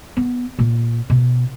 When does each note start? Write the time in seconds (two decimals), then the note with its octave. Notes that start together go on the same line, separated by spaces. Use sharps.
0.17 B3
0.59 A#2
1.10 B2